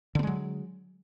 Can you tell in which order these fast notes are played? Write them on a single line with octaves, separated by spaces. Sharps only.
D3 B3 G#3 F#3